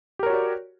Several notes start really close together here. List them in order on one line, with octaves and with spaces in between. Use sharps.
G4 A#4 C#5 F#4 D5